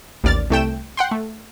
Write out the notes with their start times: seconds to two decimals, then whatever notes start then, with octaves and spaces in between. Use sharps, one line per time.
0.24 A1 D#2 D5 F6 A6
0.50 C2 A3 G5 E7
0.97 F#5 G5 C6
1.11 A3